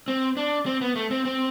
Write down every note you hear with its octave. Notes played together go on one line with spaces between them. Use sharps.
C4
D4
C4
B3
A3
C4
C4